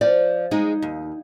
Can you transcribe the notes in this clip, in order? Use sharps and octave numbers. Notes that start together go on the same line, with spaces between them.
F3 D5
G#3 D#4
D#2